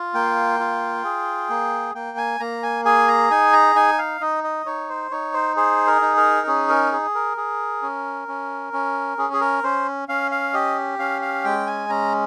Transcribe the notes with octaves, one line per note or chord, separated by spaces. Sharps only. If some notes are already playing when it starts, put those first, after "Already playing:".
Already playing: F4
A#3 G5
F4
G#4
A#3
A#3 G5
G#5
A#3 A#5
G#5
G#4 G#5
A#5
D#4 G#5
A#5
D#4 G#5
F5
D#4 D#5
D#5
D#4 C#5
C5
D#4 C#5
C5
G#4 C5
A#4
D#4
A#4
C#4 G#4
A#4
G#4
A#4
G#4
C#4
C#4
C#4
C#4 G#4
G#4
A#4
C#4 C5
C#4 F5
F5
G4 D#5
C#4 F5
F5
G#3 G5
G#5
C#4 A#5